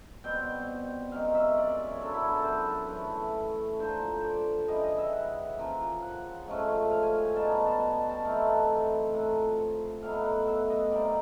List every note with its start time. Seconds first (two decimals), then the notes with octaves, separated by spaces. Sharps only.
0.24 B2 G3 C4 G5
1.12 F#2 D#3 G#3 F5
1.35 E5
1.58 D5
1.87 C#5
2.01 C#3 F#3 B3 D4 A4
2.13 E4
2.25 E4
2.35 A4
2.42 B4 C5
2.90 E3 A3 C#4 B4
3.79 D3 F3 A#3 C5
4.25 D5
4.68 C#3 E3 G3 D#5
4.84 D#5
4.98 E5
5.13 F#5
5.58 C#3 F3 A#3
6.02 F#5
6.47 G#2 F3 A3 C#4
6.91 F5
7.03 G#5
7.25 G#5
7.36 B2 G3 B3 D#4 A5
7.66 A5
8.09 A5
8.25 E3 A3 C4 D#4 F5
8.48 F#5
9.13 A2 F3 A#3 F#5
10.03 A2 F#3 B3 D#4 F5
10.15 F#5
10.25 F#5
10.37 F#5
10.47 E5
10.70 D#5
10.92 C3 D#3 G3 A#3 D5